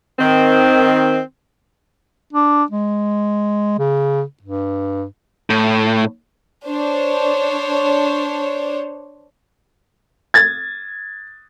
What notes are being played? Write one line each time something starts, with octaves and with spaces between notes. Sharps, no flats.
D#3 C4
D4
G#3
C#3
G2
A2
D4 C5 C#5
G#6 A6